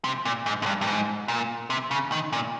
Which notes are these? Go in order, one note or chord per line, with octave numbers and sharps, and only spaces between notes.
C3
A#2
G#2
G#2
G2
G2
G#2
A#2
C3
C#3
D#3
A#2